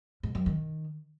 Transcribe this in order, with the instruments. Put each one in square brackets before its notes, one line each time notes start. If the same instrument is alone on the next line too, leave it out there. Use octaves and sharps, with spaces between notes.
[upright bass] G#2
F#2
D#3